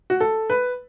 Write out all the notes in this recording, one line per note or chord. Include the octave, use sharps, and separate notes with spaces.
F#4
A4
B4